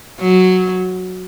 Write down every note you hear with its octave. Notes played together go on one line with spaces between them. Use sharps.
F#3